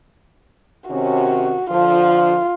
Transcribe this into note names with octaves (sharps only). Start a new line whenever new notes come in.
C3 D#3 C#4 F#4
D3 F3 F4